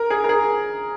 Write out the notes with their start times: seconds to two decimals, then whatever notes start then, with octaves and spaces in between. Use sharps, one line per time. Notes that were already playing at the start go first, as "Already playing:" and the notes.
Already playing: A#4
0.10 G#4
0.24 A#4
0.29 G#4